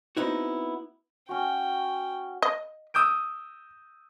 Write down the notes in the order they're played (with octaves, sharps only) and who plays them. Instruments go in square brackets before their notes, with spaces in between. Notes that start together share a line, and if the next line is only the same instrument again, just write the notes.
[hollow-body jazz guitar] B3 C4 D#4 E4 F#4
[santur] C#4 F#4 [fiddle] G5
[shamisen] D#5
[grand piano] D#6 E6 G6 D7